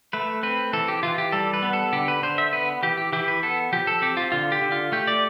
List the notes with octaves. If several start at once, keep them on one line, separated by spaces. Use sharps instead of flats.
A3 B4
C4 B4
E3 A4
G4
E3 F4
G4
G3 A4
B4
B3
A4
D3 G4
B4
D3 C5
E5
B3 B4
E3 G4
G4
E3 G4
B4
B3 A4
F3 G4
A4
C4 G4
F4
D3 F4
G4
D3
F4
A3 G4
D5